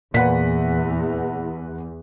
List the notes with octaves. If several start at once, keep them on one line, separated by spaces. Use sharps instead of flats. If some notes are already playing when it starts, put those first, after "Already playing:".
E2 A#2 B4 F#5 B6